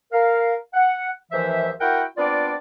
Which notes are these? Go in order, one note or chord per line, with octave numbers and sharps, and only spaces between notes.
A#4 F5
F#5
D#2 G#2 E3 F3 C5 E5
E4 F#4 A#4 F#5 G5
B3 C4 D4 F4 D5